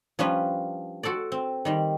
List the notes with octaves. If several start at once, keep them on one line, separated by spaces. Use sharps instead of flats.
F3 G3 C#4 D4 B4
F#4 A4 C5 D5
C4
D#3 G3 C6